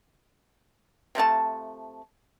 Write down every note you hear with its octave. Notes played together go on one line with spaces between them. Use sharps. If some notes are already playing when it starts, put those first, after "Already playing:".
C3 F3 A3 A5